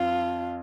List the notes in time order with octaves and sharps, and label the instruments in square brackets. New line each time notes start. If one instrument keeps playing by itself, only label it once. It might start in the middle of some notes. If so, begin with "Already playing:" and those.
Already playing: [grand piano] F2 [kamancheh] F4